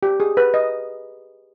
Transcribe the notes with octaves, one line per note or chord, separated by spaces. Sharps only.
G4
G#4
B4
D#5